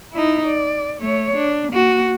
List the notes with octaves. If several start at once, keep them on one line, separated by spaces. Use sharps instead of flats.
D#4 E4
D5
A3 C#5
D4
A#3 F#4